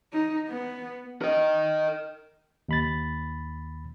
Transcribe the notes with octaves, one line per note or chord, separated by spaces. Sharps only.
D#4
B3
A#4 D#5
D#2 B5 A6